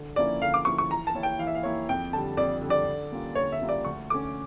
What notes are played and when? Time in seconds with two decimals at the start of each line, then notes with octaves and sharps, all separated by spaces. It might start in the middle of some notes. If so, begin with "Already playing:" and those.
Already playing: D3
0.16 F3 A#3 C#4 E4 D5
0.41 D3 F5
0.54 D6
0.65 F3 A#3 C#4 E4 C#6
0.78 C#6
0.91 E3 A#5
1.07 A5
1.14 A#3 E4 G4 C#5
1.23 G5
1.39 E3 F5
1.47 E5
1.55 F5
1.63 A#3 E4 G4 C#5
1.89 F2 G5
2.13 D3 G3 A5
2.37 F2 D5
2.62 D3 G3
2.70 D5
2.86 D3
3.11 G3 A#3 C#4 F4
3.35 D3 C#5
3.52 E5
3.61 G3 A#3 C#4 F4
3.69 D5
3.85 D2 C#6
4.10 D3 A3 C#4 D6